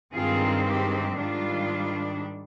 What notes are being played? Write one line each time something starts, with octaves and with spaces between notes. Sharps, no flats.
G2 D#3 G#3 C4 F4 G#4
G4
G#2 D#3 G3 D4 F4